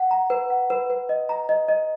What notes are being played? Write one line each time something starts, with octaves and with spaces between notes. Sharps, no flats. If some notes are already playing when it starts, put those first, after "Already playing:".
Already playing: F#5
A#5
B4
F#5
B4
B4
D#5
A#5
D#5
D#5